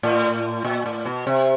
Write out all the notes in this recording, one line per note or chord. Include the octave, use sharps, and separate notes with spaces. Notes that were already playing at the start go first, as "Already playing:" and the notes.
A2
A#2
A2
B2
C3